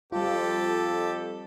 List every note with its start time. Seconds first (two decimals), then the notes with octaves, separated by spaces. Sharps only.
0.12 F2 G3 F4 G4 A4